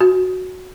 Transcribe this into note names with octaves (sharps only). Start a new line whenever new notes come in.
F#4